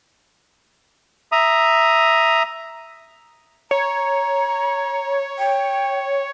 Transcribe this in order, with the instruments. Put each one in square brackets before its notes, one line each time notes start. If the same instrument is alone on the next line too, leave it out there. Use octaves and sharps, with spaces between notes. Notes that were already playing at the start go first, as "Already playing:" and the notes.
[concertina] E5 A#5 D#6
[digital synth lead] C#5 [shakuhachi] A#5
[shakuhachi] G5